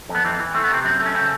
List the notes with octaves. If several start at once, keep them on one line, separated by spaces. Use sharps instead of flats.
F2
B3
E3 C4
E3
A3 C4
B3
C3 C4
F#2 C4
A3
C#4
C#3 C4